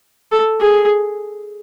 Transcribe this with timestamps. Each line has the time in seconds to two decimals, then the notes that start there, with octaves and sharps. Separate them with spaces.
0.32 A4
0.60 G#4